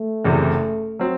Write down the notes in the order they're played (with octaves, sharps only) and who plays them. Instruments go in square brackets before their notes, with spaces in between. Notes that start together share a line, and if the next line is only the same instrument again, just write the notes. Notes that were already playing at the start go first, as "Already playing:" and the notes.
Already playing: [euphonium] A3
[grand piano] F#1 E2 C3
F#3 C4